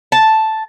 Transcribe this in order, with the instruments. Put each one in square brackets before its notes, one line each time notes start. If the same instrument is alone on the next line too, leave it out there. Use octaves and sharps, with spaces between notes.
[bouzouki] A5